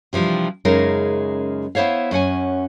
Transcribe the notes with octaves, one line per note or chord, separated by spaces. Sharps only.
C3 E3 F3 G3 D4
F#2 C#3 G#3 D#4 A#4
B3 E4 C5 C#5 F5
F#2 C#4 F#5 G#5